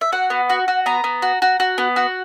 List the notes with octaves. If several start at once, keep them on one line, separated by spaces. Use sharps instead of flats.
E5
F#4 F#5
B3
F#4
F#4
B3 A#5
B3
F#4
F#4
F#4
B3
F#4